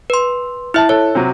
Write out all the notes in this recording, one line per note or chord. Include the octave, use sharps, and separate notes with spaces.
B4 C6
E4 E5 A5 F6
A4 C#5
C3 F#3